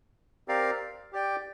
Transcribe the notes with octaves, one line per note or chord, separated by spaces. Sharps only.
C4 G4 A#4 D5 F5
G4 D5 G5